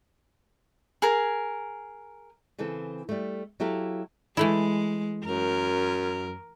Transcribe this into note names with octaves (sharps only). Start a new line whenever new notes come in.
G#4 A#4
C#3 E3 C4 A4
G3 A3
F#3 E4 G4 A4 F5
E3 G#3 A3 E4
F#2 A#4